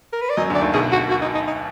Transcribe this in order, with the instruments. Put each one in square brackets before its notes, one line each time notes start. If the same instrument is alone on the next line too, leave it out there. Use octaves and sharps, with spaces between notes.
[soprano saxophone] A#4
B4
D5
[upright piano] F#2 F#3 [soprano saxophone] D#5
[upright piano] D2 D3 [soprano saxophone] D5
[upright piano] D#2 D#3
[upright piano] B1 B2 [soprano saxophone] G#4
[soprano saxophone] F#4
F#4
D#4
D#4
D#4